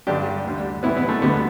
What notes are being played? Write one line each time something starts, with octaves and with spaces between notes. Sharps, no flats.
G2 D3 G3 D4 G4
D2 D3 G3
A2 E3 G3 B3 E4
B3
A3
D2 D3 G3 B3